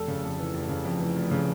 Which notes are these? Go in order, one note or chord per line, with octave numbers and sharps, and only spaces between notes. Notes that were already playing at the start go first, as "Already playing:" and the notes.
Already playing: F1 A4
C#3
F2
E3
F1
C#3
F2
E3
F1
C#3